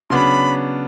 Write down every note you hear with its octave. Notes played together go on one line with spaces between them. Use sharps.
C#3 F#3 B3 D4 B5 C6